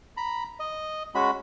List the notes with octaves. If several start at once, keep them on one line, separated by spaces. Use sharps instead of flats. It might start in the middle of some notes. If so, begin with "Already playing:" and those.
A#5 B5
D#5
G#3 C#4 F#4 B5